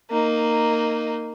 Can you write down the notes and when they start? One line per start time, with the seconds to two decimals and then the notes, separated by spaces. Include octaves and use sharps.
0.10 A#3 D#4